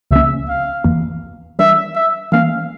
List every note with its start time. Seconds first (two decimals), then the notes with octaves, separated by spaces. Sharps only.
0.11 C#2 C#3 F3 A#3 C#4 E5
0.48 F5
0.84 F2 E3 A#3
1.59 E3 G3 D4 E5
1.95 E5
2.32 E3 A#3 C#4 F5